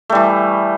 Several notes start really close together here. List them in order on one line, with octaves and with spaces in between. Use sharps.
A3 G3 E3